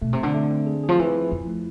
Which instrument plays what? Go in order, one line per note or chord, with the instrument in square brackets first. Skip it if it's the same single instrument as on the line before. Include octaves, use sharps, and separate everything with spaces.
[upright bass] B2 [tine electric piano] A3
[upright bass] C3
[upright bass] D3 [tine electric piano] C4
[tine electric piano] A3
C4
G#4
G#4
[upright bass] F3
[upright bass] E3 [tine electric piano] F4
[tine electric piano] F3
[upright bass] F2 [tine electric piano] E4
[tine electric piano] A3